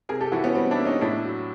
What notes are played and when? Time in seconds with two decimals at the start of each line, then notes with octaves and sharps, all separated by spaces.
0.09 C3 G#4 A#4
0.20 G4 A4
0.32 E3 E4 F#4
0.44 B3 C#4
0.55 G3 C4
0.71 D4 E4
0.78 A#3
0.85 C#4 D#4
1.01 A2 D4 E4
1.24 F#3